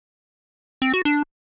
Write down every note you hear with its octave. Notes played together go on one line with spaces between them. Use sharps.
C4
F#4
D4